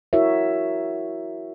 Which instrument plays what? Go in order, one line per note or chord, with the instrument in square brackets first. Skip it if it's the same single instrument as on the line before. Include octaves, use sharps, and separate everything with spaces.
[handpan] E4 F#4 A#4 C#5 E5